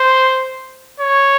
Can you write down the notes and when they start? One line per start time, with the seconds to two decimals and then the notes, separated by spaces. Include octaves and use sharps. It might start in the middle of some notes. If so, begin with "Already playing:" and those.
Already playing: C5
1.00 C#5